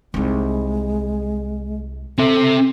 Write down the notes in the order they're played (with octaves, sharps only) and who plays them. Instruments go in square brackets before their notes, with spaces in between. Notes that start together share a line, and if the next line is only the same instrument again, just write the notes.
[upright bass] C2 D#4 [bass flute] G#3
[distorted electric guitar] C4 E5 [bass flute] A4